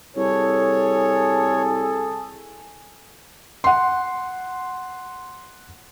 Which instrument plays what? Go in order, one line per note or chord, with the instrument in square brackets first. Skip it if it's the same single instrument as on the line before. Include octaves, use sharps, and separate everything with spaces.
[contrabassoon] C2 [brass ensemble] G#4 A4 [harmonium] C#5
[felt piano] F#5 C6